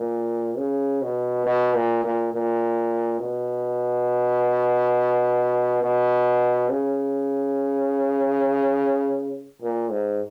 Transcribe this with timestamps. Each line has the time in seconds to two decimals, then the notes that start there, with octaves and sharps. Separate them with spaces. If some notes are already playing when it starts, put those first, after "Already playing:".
Already playing: A#2
0.58 C#3
1.02 B2
1.46 B2
1.75 A#2
2.04 A#2
2.33 A#2
3.20 B2
5.83 B2
6.70 C#3
9.62 A#2
9.91 G#2